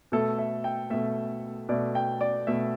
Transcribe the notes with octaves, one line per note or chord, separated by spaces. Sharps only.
B2 A3 A4
E5
G5
B2 A3 E5
B2 A3 D5
G5
D5
B2 A3 E5